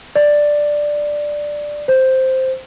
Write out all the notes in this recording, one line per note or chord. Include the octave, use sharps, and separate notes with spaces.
D5
C5